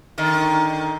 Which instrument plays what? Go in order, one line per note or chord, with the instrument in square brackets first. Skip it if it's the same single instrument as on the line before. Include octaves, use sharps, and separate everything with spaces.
[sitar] D3 D#3